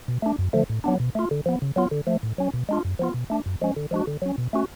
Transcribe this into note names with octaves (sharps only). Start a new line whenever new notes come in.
B2
A3 D4
F#2
D3 F3 A3
A2
F#3 B3 D4
B2
A3 F4
D3
F3 B3
C#3
F#3 B3 F4
D3
F3 A3
A2
F#3 C#4
B2
G#3 D4 F4
F#2
F3 B3 F4
B2
A3 D4
F#2
F3 G#3 C#4
D3
F3 G#3 D4 F#4
D3
F#3 C#4
B2
A3 C#4 F#4